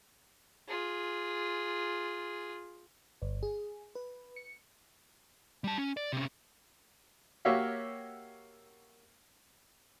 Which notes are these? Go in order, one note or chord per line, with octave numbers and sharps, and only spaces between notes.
F4 G#4
G1
G#4
B4
C#7
G3 A5
C#4
D5
C3 C#4
A#3 F#4 G4 C#5 E5 F5